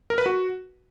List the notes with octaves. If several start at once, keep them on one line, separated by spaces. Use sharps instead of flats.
A#4
B4
F#4